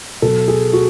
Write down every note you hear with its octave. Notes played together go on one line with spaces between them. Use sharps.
B2 F#3 A4
G#4
F#4